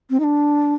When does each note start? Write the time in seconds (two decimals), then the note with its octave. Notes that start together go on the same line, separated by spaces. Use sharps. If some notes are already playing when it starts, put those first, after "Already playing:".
0.10 C4
0.20 D#4
0.24 D4